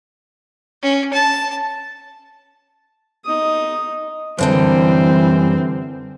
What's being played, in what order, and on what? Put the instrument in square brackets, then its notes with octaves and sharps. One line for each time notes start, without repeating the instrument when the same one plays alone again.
[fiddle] C#4
A5
[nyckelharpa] D#4 D#6
[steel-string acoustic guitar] F#2 D3 G3 [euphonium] E3 [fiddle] C4